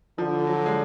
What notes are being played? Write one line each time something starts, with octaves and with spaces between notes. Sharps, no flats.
D3 F3
F#3
G#3